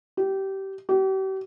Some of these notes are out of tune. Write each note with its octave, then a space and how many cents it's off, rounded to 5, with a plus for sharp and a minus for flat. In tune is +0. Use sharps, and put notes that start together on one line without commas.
G4 -20
G4 -40